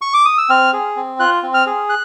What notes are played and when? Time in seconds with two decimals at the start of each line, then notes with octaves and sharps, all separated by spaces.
0.01 C#6
0.14 D6
0.25 D#6
0.38 E6
0.49 C4 F6
0.73 G#4
0.96 C4
1.19 F4 F#6
1.43 C4
1.54 F6
1.66 G#4
1.89 F#6